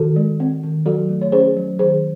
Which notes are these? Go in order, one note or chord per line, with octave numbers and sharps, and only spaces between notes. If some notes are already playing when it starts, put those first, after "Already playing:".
Already playing: D#3 F#4 A4
G#3
C4
D#3
F#3 F#4 A4
A3
C#5
C#4 G#4 C5
F#3
D#3 G#4 C5